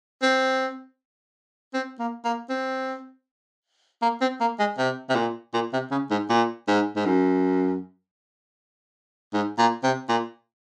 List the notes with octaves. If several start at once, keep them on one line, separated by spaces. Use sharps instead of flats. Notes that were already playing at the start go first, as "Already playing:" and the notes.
C4
C4
A#3
A#3
C4
A#3
C4
A#3
G#3
C3
C3
A#2
A#2
C3
C#3
G#2
A#2
G#2
G#2
F#2
G#2
A#2
C3
A#2